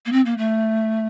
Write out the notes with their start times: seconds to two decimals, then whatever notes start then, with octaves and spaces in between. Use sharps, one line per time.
0.06 A#3
0.12 C4
0.25 A#3
0.38 A3